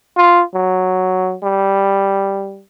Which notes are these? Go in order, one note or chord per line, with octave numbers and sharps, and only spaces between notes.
F4
F#3
G3